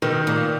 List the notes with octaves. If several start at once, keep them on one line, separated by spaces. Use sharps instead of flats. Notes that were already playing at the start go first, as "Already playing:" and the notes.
B2 D#3 D#4
A#2